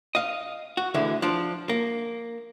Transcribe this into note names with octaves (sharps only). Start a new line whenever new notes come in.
D#5 F5
F#4
D2 D3 E3 G#3
F3 D4
A#3